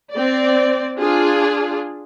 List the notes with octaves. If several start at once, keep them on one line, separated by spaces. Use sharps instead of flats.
C4 D5
D4 F4 G#4